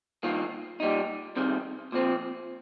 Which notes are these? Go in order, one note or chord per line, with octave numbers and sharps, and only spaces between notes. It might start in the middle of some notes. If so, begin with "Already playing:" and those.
G2 D#3 A#3 F4
A#2 G3 D#4
C2 C3 D#3
A#2 F3 C4